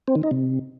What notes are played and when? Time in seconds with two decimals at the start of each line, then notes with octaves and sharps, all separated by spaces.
0.08 C4
0.15 D#3
0.23 D#4
0.31 C3